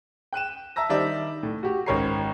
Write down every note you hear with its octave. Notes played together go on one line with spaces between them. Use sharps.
G5 F#6 D#7 E7
E5 A5 A#5 E6 A#6
D#3 G3 D4 C5 D5 E5
A2
F#4 G4
G#1 C#4 A#4 C#5 A#5 C7